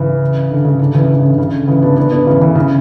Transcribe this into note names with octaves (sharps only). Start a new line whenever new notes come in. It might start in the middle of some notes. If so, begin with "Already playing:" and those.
Already playing: C#3 E3
D3
C#3
D3
C#3 E3
D3
C#3
D3
C#3
D3
C#3 E3
B3 D4
B3 D4
B3 D4
C#3 E3
C#3 E3
C#3